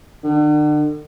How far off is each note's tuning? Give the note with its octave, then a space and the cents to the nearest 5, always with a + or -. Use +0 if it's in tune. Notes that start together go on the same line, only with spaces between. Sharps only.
D3 +40